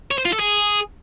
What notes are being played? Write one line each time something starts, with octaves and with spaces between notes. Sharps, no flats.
C#5
C5
F4
A4
G#4